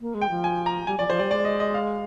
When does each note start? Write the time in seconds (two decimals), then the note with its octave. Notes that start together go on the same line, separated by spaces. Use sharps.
0.01 A#3
0.14 G#3
0.21 G5
0.30 F3
0.44 G#5
0.66 A#5
0.87 G3 G#5
0.98 F3 D5
1.09 F3 C5
1.19 G3 D5
1.31 G#3 D5
1.45 D#5
1.60 D#5
1.74 F5